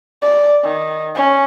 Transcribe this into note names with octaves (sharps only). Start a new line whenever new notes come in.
D5
D#3
C#4